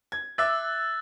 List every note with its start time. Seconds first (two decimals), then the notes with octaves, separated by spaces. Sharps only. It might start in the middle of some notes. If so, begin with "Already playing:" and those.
0.12 G#6
0.38 E5 D6 E6 F#6 A6